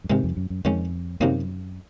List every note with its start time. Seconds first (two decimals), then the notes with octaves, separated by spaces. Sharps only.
0.04 F#2
0.10 G#2 C3 D#3 G#3
0.24 F2
0.37 F#2
0.50 F#2
0.65 F2 D#3 G#3 C#4
1.20 F#2 C3 D#3 F#3 A#3 D#4